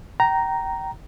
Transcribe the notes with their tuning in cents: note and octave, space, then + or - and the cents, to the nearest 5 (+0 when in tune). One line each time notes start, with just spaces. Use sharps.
G5 -25 A#5 +0